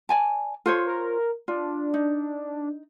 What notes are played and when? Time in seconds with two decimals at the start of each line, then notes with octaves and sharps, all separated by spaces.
0.09 D5 G#5 A5
0.66 F4 A4 C5 C#5
0.87 A#4
1.48 D4 F4
1.94 D#4